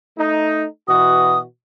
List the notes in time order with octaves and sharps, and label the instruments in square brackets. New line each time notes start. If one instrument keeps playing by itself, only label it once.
[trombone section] A3 D#4
[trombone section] B2 E3 F#4 [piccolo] D#6